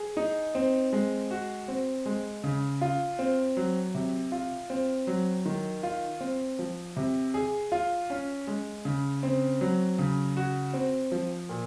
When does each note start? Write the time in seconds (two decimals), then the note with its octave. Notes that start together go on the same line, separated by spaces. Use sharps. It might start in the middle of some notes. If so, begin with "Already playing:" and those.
Already playing: G#4
0.17 D#4
0.55 C4
0.93 G#3
1.31 F#4
1.68 C4
2.06 G#3
2.44 C#3
2.81 F4
3.19 C4
3.57 F#3
3.94 C3
4.32 F4
4.70 C4
5.07 F#3
5.45 D#3
5.83 F4
6.20 C4
6.59 F3
6.96 C3
7.34 G#4
7.72 F4
8.10 C#4
8.47 G#3
8.85 C#3
9.23 C4
9.61 F#3
9.98 C#3
10.37 F#4
10.73 C4
11.12 F3
11.49 A#2